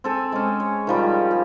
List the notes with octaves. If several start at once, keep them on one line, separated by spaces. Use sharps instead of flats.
C4 A4 G#5
G#3 C#4
C#5
D#3 F3 G3
G#4